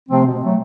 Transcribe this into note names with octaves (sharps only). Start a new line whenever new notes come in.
C3 F3 A3 C4
B2
F#3 A3